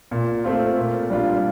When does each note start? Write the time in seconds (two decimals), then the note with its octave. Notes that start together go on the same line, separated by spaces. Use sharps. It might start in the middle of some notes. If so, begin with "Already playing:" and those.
0.11 A#2
0.44 A3 C4 F4
0.77 A#2
1.10 G3 D4 F4